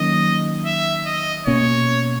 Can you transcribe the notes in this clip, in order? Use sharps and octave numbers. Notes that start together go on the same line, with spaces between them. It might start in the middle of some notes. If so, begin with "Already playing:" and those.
Already playing: D#3 F#3 A#3 C#4 D#5
E5
D#5
B2 A#3 C#4 C#5